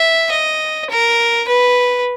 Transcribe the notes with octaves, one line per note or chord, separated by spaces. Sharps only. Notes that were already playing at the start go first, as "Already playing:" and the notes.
Already playing: E5
D#5
A#4
B4